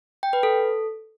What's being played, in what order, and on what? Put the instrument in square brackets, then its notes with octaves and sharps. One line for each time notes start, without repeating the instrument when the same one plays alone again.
[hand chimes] G5
B4
A4